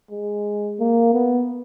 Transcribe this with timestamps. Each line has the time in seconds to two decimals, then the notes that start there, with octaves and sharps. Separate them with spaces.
0.11 G#3
0.80 A#3
1.13 B3